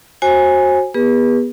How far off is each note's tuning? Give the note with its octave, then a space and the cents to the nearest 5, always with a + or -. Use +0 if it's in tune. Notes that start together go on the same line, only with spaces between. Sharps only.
F#4 +0 C5 +35 G#5 -5
B3 -20 G#4 -45 B4 -30